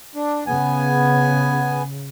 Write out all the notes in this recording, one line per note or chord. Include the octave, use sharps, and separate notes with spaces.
D4
C#3 B3 G#5